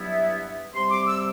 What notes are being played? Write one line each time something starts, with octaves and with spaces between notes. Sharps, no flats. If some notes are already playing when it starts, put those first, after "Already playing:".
Already playing: G2 F#3 B3 E4
E5
C3 G3 C4 C6
D6
E6